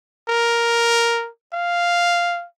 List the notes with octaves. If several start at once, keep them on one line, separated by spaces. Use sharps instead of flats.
A#4
F5